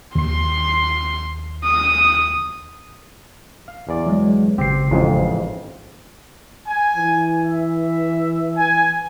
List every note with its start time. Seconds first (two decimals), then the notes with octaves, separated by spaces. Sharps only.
0.15 D#2 C6
1.64 D#6
3.68 F5
3.89 E2 D5
4.06 F#3 G#3
4.58 G#1 C#3 C4 G4 C7
4.91 A1 F2 G#2
6.66 G#5
6.97 E3
7.46 E5
8.55 G#5